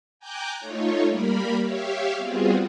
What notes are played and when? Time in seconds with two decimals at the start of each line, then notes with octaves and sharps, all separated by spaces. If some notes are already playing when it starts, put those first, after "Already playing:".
0.19 G5 G#5 A#5 D6 F#6 G6
0.58 A3 D#4 F4 C#5
1.06 G3 A#3 A#4 B5
1.59 G4 C#5 E5 F5
2.16 G3 B3 C4 F4 F#4 G#4